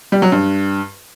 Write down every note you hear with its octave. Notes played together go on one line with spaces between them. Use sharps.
G3
F#3
G2